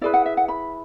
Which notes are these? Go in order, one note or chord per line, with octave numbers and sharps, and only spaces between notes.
E4 G#4 B4 D5
F#5
E5
F#5
B5